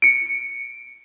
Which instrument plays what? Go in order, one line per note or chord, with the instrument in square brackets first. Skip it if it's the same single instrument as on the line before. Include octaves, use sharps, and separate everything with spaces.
[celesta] C#7 D7